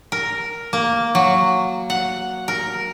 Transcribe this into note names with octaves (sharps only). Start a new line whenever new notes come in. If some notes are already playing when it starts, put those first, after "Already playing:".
A#4
A#3
F#3
F#5
A#4